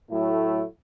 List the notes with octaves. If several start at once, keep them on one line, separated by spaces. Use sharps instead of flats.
A2 F#3 A3 E4